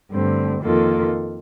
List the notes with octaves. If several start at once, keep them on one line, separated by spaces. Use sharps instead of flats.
G2 D3 A3 C4
F2 D#3 A#3 F4 A4